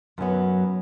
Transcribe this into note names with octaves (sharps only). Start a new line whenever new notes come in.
F#2 F#3 B3